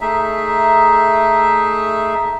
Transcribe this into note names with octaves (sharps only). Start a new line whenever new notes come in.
A3 D#4 G#4 E5